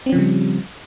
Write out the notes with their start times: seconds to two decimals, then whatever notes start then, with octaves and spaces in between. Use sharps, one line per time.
0.06 C4
0.09 C#4
0.12 F3
0.16 C#3
0.19 G3